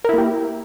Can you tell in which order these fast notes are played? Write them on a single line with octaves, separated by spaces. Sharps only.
A#4 E4 A#3 G4